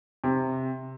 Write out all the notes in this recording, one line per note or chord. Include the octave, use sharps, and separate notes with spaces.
C3